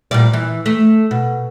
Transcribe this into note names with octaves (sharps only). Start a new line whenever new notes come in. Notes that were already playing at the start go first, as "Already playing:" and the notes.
A#2 G3 D5
E3
A3
B2